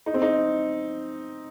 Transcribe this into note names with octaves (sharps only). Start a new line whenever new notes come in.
D#4
C4
D#4